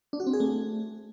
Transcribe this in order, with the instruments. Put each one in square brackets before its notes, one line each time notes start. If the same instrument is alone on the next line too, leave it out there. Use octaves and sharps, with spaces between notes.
[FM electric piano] D4
F#4
C4
G#4
A3